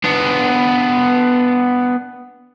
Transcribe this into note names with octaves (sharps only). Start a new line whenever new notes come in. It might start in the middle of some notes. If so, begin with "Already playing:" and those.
B3 D4